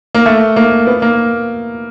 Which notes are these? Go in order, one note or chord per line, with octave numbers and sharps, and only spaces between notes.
A#3
A3
A#3
B3
A#3